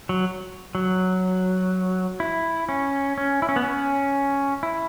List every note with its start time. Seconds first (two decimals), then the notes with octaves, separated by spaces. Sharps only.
0.09 F#3
0.75 F#3
2.20 E4
2.69 C#4
3.18 C#4
3.42 E4
3.49 C#4
3.56 B3
3.63 C#4
4.63 E4